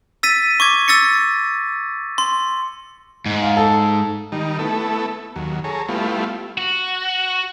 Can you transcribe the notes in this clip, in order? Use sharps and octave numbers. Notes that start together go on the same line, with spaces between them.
E6 A6 B6 D#7
C#6 D6 G#6
E6 A6 A#6 C#7
C6
G#2
F5
A4
D#3 G3 D#4
A3 B3 E4 A4
D#2 F#3
G#4 A4 C#5 A#5
G3 A3 B3 E4 F4
F#4